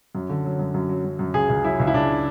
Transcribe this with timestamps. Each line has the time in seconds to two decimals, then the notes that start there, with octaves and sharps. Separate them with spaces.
0.15 F#2
0.30 D3
0.45 F#3
0.59 F#2
0.74 F#2
0.89 F#3
1.05 F#2
1.19 F#2
1.34 C#2 G#4
1.49 C#2
1.64 F#3 E4
1.80 C#2
1.87 E4
1.94 C#2 D4